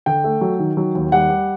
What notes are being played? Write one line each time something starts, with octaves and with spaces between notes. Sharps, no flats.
D3 G5
A3
F#3
D#3
F#3
D#2
G3 F#5
G3